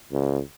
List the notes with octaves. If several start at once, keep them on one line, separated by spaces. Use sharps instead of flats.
C#2